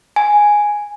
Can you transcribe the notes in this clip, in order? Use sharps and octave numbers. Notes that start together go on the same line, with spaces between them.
G#5